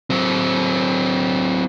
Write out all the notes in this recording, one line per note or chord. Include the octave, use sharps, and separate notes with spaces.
F#3 C4